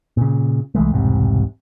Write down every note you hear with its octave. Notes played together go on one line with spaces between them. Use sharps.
A#2 C#3
C2 E3 G#3 A3
E1 C2 G#2 C3